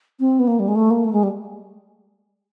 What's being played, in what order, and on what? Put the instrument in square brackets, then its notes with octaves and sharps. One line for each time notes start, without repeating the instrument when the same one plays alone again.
[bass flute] C4
B3
A#3
G3
G#3
A3
A#3
A3
G#3
G3